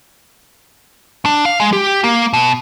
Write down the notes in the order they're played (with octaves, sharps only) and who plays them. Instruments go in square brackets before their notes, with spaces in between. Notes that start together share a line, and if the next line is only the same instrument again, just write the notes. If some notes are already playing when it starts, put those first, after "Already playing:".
[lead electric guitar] D4
F5
G#3
G4
A#3
B2